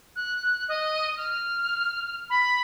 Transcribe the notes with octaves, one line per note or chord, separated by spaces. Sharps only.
F#6
D#5
F6
B5